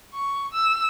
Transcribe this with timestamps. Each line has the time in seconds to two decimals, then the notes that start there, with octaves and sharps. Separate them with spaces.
0.14 C#6
0.53 E6